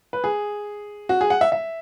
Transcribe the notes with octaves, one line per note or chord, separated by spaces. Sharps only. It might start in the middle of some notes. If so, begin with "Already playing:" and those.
B4
G#4
F#4
G#4
F#5
E5
E5